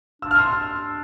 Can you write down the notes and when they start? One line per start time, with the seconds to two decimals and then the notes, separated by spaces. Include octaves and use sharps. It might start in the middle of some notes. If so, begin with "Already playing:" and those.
0.22 D4 E6
0.31 F6
0.38 C6 E6